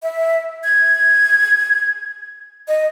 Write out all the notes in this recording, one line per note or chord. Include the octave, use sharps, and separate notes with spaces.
E5
G#6
D#5